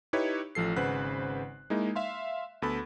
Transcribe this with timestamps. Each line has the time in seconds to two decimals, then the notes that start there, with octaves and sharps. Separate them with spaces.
0.13 D#4 E4 G4 B4 C#5
0.55 A1 F3 A4 C7
0.76 G#1 C#3 B4 C5 F#5 F#6
1.70 G#3 A#3 D#4 E4
1.96 E5 F5 C6
2.62 D2 B3 A4 B5